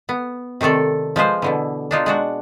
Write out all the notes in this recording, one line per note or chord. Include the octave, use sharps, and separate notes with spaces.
B3
C3 D#3 A3 A4 D5
F3 G#3 B4 C5
B2 D3 E3
D4 D#4 F4
G#3 D4 F#4